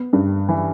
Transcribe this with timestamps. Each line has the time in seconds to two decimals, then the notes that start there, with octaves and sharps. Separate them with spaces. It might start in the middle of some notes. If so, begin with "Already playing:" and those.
Already playing: B3
0.13 G2
0.49 E3